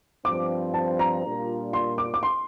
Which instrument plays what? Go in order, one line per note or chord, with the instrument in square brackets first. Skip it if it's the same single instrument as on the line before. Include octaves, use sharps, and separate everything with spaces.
[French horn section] G2 F3 C4 [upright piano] D6
[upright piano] A5
A#5
[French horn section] A#2 G3 D4 F4 A#4
[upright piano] C6
D6
D6
C6